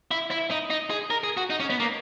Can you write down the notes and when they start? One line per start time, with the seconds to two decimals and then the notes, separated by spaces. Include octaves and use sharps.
0.11 E4
0.31 E4
0.51 D#4
0.70 D#4
0.90 G#4
1.10 A#4
1.24 G#4
1.37 F#4
1.50 D#4
1.60 C#4
1.70 B3
1.80 A#3